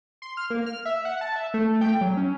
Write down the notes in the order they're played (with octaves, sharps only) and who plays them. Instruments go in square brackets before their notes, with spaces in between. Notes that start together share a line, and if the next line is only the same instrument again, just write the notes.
[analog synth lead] C6
F6
A#3
F6
E5
F#5
A5
E5
A3
G5
F#3
C#4